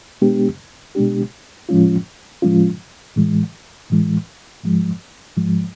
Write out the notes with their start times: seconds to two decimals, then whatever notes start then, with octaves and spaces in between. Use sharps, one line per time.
0.22 B2 G#3 B3 D4 G4
0.95 B2 G#3 B3 D4 G4
1.69 A2 F3 G#3 C#4 F4
2.42 A2 F3 G#3 C#4 F4
3.16 A2 E3 G#3
3.90 A2 E3 G#3
4.63 G#2 F3 G#3
5.37 G#2 F3 G#3